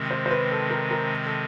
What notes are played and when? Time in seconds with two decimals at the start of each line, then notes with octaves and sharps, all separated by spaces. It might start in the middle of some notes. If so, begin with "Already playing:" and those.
Already playing: C3 D#3 G#3 C4
0.11 C5
0.26 C5
0.31 B4
0.51 A4
0.71 A#4
0.91 A#4
1.26 A4